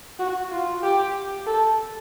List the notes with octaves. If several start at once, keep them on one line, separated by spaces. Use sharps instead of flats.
F#4
F4
G4
A4